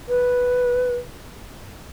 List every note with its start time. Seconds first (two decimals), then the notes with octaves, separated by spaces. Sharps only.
0.08 B4